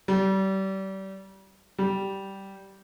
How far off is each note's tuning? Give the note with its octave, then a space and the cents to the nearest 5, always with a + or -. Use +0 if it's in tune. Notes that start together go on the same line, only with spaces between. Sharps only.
G3 -30
G3 -10